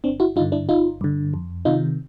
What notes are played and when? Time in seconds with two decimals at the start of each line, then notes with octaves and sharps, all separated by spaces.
0.04 G1 C4 D4
0.20 E4 F#4
0.36 G2 D#4 F4
0.41 D3
0.52 D4 E4
0.69 G1 D#4 F4
1.01 G2 D3
1.34 F2
1.65 C3 D#3 D#4 F4